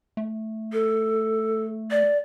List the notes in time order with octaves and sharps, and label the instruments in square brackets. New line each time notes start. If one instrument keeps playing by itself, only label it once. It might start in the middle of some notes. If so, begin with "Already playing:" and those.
[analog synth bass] A3
[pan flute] A4
D5